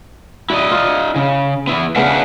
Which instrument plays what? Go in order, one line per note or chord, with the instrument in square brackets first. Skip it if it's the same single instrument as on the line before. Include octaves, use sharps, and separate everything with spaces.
[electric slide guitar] E4 D5 D#5 [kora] F#4
[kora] F4
[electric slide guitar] C#3 [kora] G#4
[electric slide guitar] B3 E4
[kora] C#3 B3 C#4 [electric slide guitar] D4 E5 F#5